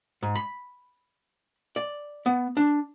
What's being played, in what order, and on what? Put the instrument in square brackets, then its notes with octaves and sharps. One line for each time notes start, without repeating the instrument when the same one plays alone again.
[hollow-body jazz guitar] G#2
B5
D5
B3
D4